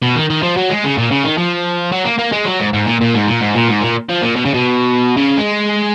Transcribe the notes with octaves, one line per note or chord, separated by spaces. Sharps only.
B2
D#3
D#3
F3
F#3
G#3
C#3
A#2
C#3
D#3
F3
F#3
A#3
A#3
G#3
F#3
G#2
G#2
A#2
A#2
G#2
A#2
G#2
A#2
G#2
A#2
F3
A#2
B2
C#3
B2
C#3
G#3